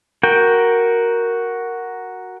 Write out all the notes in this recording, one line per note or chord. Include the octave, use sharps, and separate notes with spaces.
F#4 A#4 G5